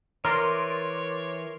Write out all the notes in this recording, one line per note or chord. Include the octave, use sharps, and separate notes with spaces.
E3 A#4 C#5 D5 C6